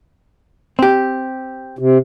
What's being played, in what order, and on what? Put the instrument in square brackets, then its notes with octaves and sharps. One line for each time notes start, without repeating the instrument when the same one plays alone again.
[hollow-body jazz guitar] C4 G4
[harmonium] C3